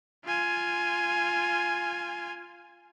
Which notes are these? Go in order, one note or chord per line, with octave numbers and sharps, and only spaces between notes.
F4 G#5